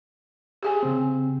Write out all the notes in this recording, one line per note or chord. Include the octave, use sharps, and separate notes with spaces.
G4 G#4 G#5
C#3 C4